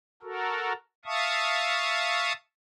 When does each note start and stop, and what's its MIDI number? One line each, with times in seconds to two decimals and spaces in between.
0.23 0.73 66
0.23 0.73 69
0.23 0.73 70
1.05 2.33 76
1.05 2.33 77
1.05 2.33 81
1.05 2.33 85
1.05 2.33 87